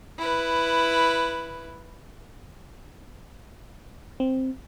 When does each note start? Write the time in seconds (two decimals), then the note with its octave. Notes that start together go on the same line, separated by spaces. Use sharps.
0.18 E4 B4
4.20 C4